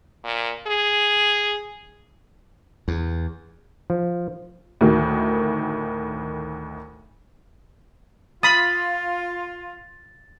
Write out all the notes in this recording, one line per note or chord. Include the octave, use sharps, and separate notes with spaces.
A#2
G#4
E2
F3
D2 A2 D#3
F4 B5 D#6 A6